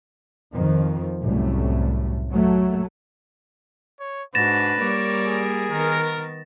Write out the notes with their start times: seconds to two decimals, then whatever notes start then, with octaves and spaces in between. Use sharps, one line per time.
0.52 F2 D#3 F3
1.23 C2 F#2 A2 A3
2.32 F#3 A3
4.00 C#5
4.35 G#2 D4 F#4 B4 A6 A#6 E7
4.80 G3 A#3 A#4 C#5 D5
5.25 G#4
5.72 D#3 B3 A#4